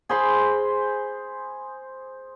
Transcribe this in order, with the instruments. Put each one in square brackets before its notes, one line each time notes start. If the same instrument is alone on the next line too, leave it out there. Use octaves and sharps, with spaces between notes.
[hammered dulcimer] G#4 C5 B5 C6